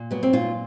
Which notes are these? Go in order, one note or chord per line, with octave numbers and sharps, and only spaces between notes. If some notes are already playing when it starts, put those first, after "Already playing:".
Already playing: A#2
F#3 B3
C4
A#2 F4